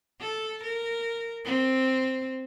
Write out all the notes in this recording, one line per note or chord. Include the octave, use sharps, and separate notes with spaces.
A4
A#4
C4